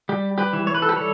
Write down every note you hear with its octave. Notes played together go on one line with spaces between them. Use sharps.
G3 G4
G4 B4
E3
C#5
B4
A4
G4 B4
G3 A4 C#5